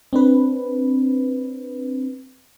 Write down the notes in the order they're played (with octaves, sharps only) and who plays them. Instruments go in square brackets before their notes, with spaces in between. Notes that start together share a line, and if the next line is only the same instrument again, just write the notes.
[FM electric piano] C4 D4 B4